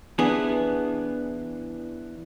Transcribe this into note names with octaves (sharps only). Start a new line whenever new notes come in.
E3 B3 D4 G#4